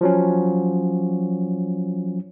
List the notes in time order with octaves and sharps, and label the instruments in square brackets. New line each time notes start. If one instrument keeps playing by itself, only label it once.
[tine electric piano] F3 F#3 C#4